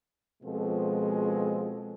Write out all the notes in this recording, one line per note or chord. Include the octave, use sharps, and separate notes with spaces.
B2 F3 G#3 C4 F4 A4